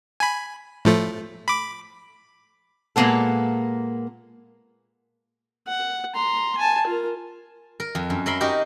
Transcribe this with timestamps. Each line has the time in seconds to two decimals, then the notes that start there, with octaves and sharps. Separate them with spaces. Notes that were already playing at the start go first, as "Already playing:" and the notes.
0.20 G#5 B5
0.85 A2 F3 A3
1.48 B5 D6
2.96 A#2 G#3 A#3 B3 A4
5.68 F#5
6.15 A#5 C6
6.58 G#5 A5
6.87 F4 A#4
7.80 A#4
7.95 F2
8.10 F#2
8.26 F#3 A#4 E5 B5 C6
8.40 D#4 F#4 G4 A#4